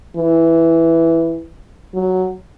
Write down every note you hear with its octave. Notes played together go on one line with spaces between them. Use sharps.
E3
F#3